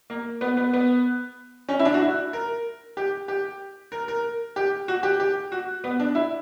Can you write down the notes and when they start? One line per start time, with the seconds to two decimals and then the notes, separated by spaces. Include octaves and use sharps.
0.10 A#3
0.41 B3
0.57 B3
0.73 B3
1.69 C#4
1.79 E4
1.85 D4
1.94 F#4
2.01 E4
2.33 A#4
2.97 G4
3.28 G4
3.92 A#4
4.08 A#4
4.56 G4
4.88 F#4
5.03 G4
5.20 G4
5.52 F#4
5.84 B3
6.00 D4
6.15 E4